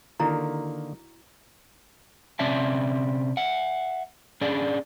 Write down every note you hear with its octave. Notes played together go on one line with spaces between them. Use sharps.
D3 D#3 A#3 E4 F#4 A#5
C3 C4 C#4 D5 E5 A5
E5 F#5
C#4 D4 G#4 D5